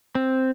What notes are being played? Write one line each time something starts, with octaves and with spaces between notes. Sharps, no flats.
C4